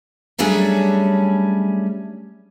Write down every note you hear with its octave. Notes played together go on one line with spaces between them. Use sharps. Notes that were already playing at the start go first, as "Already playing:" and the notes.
F#3 G3 A3 C#4 D4 G#4